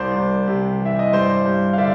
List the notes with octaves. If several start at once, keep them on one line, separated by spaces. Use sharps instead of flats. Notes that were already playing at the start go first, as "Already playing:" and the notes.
Already playing: C2 C5 D5
C2
C3
E3
E5
D#5
G2 C5 D5
G2
F5
D3 D5 E5